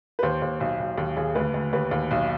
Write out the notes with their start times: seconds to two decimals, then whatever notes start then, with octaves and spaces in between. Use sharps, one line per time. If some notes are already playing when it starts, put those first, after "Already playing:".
0.19 B4
0.22 D#2 C5
0.42 D#2
0.60 B1
0.79 B1
0.98 D#2
1.17 D#2 G#4
1.35 D2 B4
1.54 D2
1.73 D#2 B4
1.91 D#2
2.11 B1